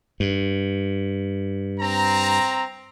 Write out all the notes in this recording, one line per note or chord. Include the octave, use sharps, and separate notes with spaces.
G2
C4 A#5